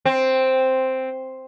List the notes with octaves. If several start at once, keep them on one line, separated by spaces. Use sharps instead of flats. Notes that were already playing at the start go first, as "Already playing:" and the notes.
C4